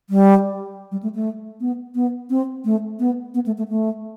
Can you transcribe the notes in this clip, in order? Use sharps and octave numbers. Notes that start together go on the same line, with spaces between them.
G3
G3
A3
A3
B3
B3
C4
A3
B3
B3
A3
A3
A3